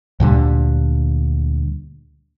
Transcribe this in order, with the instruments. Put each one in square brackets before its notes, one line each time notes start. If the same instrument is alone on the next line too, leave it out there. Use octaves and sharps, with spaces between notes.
[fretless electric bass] D2 A#2 D3 G3